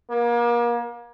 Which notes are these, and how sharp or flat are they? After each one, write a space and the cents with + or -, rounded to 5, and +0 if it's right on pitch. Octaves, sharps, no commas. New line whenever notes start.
A#3 +35